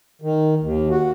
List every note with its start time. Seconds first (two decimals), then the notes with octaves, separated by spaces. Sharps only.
0.22 D#3
0.60 D#2
0.90 F#4